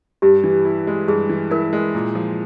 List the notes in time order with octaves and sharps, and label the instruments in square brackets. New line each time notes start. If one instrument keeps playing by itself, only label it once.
[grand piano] G2 [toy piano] G4
[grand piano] E3
E4
G#3
[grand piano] G2 [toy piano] G#4
[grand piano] E3
[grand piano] E4 [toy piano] A#4
[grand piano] G#3
A#2
F3